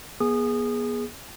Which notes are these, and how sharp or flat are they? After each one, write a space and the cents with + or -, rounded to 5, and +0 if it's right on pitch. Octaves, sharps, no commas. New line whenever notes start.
B3 -40 G#4 +0 D#6 -20